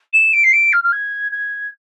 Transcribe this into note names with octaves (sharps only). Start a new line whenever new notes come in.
E7
D7
C7
D7
F6
F6
G#6
G#6